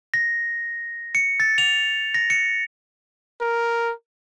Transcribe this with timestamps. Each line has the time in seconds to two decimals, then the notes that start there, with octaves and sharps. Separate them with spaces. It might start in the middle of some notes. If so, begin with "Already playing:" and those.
0.14 A#6
1.15 C#7
1.40 A6
1.58 F7
2.14 A#6
2.30 C#7
3.41 A#4